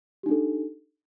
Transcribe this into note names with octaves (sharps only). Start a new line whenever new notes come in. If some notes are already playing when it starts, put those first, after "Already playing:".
D4 D#4 G4 A4